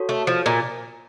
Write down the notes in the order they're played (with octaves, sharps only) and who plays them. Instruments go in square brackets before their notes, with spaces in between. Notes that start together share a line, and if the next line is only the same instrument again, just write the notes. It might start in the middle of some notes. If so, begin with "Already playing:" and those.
Already playing: [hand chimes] F#4 A4 C#5
[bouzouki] A3
F3
A#2